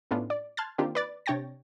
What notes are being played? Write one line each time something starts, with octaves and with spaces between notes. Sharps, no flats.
A2 A3 B3 C#4 D4 F4
D5
A5 C6 F6 F#6 G#6 A6
D#3 A#3 C4 D4 F4 G4
B4 D5 A6
C3 D4 C#5 G5 A6 A#6